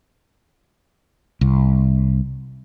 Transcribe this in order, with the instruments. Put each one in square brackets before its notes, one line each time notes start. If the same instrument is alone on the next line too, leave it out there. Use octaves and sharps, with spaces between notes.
[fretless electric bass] C2